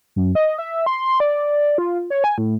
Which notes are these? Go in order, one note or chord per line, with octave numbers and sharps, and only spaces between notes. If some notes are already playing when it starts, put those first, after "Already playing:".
F#2
D#5
E5
C6
C6
D5
F4
C#5
G#5
A2